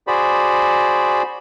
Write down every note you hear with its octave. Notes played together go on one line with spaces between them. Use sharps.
F#4 G#4 C5 D5 B5